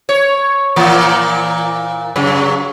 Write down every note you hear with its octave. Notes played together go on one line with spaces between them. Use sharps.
C#5
A#2 E3 A#3
F#2 C#3 F#3